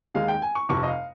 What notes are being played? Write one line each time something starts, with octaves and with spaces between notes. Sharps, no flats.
D#2 D#3 G#3 D#4 F5
G5
G#5
C#6
F1 F2 C3 C#6
D#5
F5